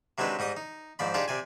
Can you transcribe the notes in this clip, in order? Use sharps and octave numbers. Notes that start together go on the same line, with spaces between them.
C3 F#3 G#3 D4 D#4 B4
G#2 G3 D#5 D#6
D#4
G#2 F3 D5 B5
D4 D#4 F4 G4 G#4 D5
C3 D5 G#5